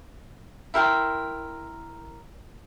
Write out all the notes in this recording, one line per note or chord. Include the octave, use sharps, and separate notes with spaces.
E4 A#4 G5 C6